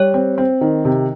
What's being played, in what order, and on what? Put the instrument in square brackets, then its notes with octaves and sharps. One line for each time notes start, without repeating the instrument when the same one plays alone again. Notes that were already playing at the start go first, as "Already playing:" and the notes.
Already playing: [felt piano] G3 [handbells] C#5
[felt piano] C4
C4
D#3
C3